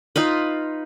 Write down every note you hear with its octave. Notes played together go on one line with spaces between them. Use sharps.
D#4 F4 B4